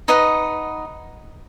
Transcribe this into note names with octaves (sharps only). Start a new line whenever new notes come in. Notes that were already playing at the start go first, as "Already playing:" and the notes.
D#4 B4 D#5 F#5